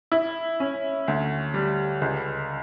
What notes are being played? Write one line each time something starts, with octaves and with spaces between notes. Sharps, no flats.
E4
C#4
D2
G3
C#2